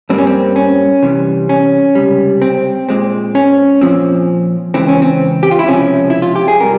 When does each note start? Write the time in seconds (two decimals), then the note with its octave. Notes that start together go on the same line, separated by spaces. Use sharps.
0.09 G2 G3 A#3 C4
0.18 C#4
0.27 C4
0.56 C#4
1.03 C2 C3 E3 G3
1.49 C#4
1.95 C#2 C3 G3
2.42 C4
2.89 A#2 G#3 C4
3.35 C#4
3.81 A#2 F3 C4
4.74 C#2 C#3 E3 C4
4.88 C#4
5.02 C4
5.43 G4
5.51 F4
5.59 E4
5.67 C#2 C3 F3 C4 C#4
6.10 E4
6.22 F4
6.36 G4
6.48 G#4
6.60 C3 G3 A#4